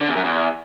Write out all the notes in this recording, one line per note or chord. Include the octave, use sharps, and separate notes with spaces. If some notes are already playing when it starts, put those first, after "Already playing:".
D3
E2
F#2
E2